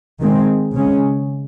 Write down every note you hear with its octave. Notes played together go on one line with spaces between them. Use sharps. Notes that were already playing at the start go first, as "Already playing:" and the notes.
D#3 G#3 C4
C#3 G#3 C#4